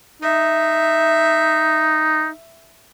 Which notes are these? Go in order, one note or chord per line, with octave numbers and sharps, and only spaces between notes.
D#4 E5